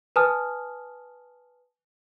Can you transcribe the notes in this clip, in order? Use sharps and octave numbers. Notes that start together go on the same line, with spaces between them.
B4 G#5 A5 D#6 F6